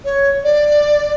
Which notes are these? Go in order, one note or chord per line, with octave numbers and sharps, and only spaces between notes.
C#5
D5